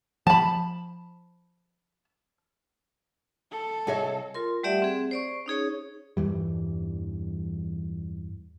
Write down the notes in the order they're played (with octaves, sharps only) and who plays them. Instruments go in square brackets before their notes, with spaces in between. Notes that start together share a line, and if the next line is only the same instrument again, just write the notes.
[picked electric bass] F3 [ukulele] A5 B5
[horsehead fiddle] A4
[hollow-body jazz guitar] C2 G#4 E5 [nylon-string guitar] C#5 D#5 G#5
[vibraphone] F4 A#4 C6
G3 A3 G4 D5 E5 F#5
C4 G#4
C5 D5 C#6
C#4 D#4 G#4 C#5
[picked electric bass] E2 G2 E3 G3